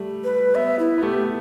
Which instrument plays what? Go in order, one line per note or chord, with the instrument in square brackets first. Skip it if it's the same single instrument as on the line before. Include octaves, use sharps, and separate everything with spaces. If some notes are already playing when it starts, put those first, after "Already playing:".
Already playing: [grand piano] G3 A3
[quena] B4
[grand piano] B3 [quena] E5
[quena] E4
[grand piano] B3
[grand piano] A3 [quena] G4